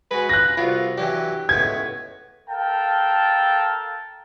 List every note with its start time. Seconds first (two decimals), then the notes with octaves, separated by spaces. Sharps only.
0.11 G#3 F#4 B4 G#5
0.29 F4 F#6 A#6
0.57 C2 F4 F#4
0.98 E3 F#3 D4 G4
1.49 C#2 A2 B3 G#6
2.49 A4 A#4 F5 G5 A5